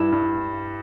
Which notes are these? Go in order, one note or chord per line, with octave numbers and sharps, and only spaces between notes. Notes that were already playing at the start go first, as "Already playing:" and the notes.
Already playing: G2 G3 E4
G2